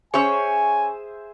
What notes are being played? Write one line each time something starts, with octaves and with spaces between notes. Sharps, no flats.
C#4 G#4 C5 C#5 E5 G#5